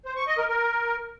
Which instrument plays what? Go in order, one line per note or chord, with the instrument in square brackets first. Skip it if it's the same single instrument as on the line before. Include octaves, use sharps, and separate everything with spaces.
[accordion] C5
C#6
D#5
A#4
A#4